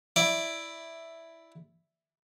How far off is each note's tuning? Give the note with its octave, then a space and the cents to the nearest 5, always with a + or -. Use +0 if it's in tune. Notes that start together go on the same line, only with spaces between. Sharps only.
E4 +0 D5 +0